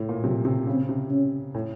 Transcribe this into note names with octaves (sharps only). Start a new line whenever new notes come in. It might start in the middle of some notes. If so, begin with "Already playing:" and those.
Already playing: A2
A#2
C3 F#3
C3
C#3 C4
C3
C#4
A2